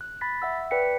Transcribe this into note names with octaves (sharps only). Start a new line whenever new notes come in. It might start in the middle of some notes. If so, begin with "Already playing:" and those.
F#6
B5 A6 B6
E5 F#5 E6
B4 D5 G5 B6 C#7